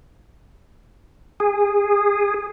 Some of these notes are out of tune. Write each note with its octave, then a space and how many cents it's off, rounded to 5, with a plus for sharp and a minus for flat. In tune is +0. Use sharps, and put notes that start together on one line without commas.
G#4 -20